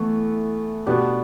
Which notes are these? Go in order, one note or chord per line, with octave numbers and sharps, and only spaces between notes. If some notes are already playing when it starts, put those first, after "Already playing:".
Already playing: E3 A3 B3
B2 B3 D4 G4